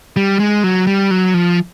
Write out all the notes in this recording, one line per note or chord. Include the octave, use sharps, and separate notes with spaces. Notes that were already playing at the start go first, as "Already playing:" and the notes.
G3
G#3
F#3
G3
F#3
F3